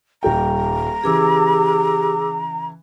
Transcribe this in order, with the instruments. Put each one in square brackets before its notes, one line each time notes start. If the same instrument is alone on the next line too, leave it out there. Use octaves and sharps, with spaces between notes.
[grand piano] D#1 G3 G5 [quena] A#5
[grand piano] C#3 E3 [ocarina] G4 [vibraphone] G#4 D6 E6